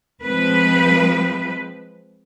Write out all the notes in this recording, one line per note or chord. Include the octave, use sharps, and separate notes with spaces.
F3 G#3 C4 B4